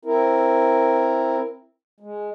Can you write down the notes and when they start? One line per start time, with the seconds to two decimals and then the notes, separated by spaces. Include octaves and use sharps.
0.05 C4 E4 A#4
2.00 G#3